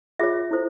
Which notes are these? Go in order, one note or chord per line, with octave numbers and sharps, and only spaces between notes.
F4 G#4 C#5 E5
E4 A4 C5